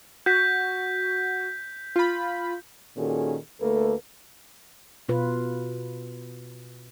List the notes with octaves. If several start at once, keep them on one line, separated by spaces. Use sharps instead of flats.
F#4 G6 B6
F4 B5
A#2 D#3 C#4 F#4 G#4 A4
D2 A3 A#3 A4 B4
B2 F4 B4